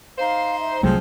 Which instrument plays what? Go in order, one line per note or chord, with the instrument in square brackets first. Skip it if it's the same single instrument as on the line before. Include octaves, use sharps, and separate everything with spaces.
[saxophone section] D#4 C5 [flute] F5
[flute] E5
[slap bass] C2 F#3 A3 [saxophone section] F3 C4 [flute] G#4